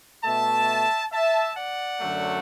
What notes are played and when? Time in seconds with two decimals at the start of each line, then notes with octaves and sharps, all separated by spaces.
0.24 B2 A3 E5 A5
1.12 E5 A5
1.56 D5 F#5
2.00 F#2 D3 F#3 A3